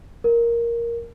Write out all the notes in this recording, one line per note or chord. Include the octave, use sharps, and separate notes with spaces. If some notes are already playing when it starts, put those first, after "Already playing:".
A#4